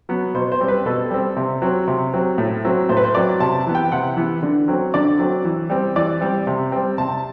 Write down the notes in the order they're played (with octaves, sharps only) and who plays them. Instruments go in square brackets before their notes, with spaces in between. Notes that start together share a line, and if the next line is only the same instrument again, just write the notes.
[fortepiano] F#3 B3
B2 C5
C5
G3 C4
B4
B2 A4
G3 C4
C3
F#3 C4
C3
F#3 C4
A2
F#3 C4
A2 C5
B4
C5
F#3 C4 D5
C3 A5
E3 B3
G5
C3 F#5
E3 B3
D3
F#3 C4
D3 D5
F#3 C4
E3
G3 C4
E3 D5
G3 C4
C3
G3 C4
C3 A5